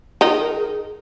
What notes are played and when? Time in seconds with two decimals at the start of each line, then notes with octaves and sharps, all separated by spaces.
0.21 D#3 D#4 F4
0.27 G4
0.32 G#4
0.42 A#4
0.52 G#4